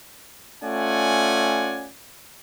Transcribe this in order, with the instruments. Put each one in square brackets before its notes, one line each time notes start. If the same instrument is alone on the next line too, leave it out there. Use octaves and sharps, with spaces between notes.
[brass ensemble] A3 C#4 F4 D5 F#5 G#5